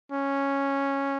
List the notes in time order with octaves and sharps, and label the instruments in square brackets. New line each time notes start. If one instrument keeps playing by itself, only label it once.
[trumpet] C#4